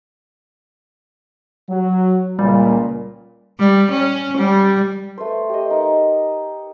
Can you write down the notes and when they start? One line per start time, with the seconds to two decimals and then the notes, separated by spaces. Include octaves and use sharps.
1.69 F#3
2.39 C#2 A#2 G3
3.59 G3
3.91 C#4
4.38 G3
5.18 A3 B4 C5
5.49 G4 D#5
5.70 D#4 A#4 C#6